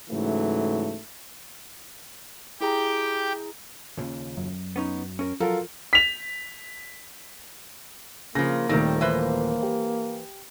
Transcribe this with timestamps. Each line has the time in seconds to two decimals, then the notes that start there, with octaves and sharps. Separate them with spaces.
0.10 G#2 C#3 E3 F#3 A3
2.61 E4 G4 G#4 G5 A#5
3.97 D#2 A#2 C#3
4.37 F#2
4.76 B3 C#4 D#4
5.19 C#4 A#4
5.40 F3 F#3 F4 A4 A#4
5.93 B6 F7
8.35 C#3 F3 A#3 A#6
8.69 D#1 D#3 G3 A3 C4 A#6
9.01 E3 A#3 B4 C5
9.63 G4